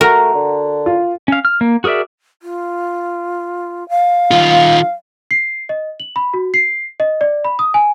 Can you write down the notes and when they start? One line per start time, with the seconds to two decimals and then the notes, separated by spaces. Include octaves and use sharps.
0.01 A3 F#4 A#4 A#5
0.34 D3
0.86 F4
1.28 C#4 F5
1.45 F6
1.61 A#3
1.84 F#4 G#4 A#4 D5 E5
2.43 F4
3.89 F5
4.31 D#3 F4
5.31 C7
5.69 D#5
6.00 F#7
6.16 B5
6.34 F#4
6.54 C7
7.00 D#5
7.21 D5
7.45 B5
7.59 D#6
7.74 G#5